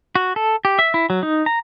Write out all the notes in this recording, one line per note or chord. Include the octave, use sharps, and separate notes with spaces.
F#4
A4
G4
E5
E4
F#3
D#4
A#5